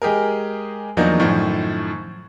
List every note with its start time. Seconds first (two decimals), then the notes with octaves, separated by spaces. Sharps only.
0.02 G#3 G4 G#4 A#4
0.97 E2 F3 F#3 A#3 D4 D#4
1.20 F#2 A2 D#3 F3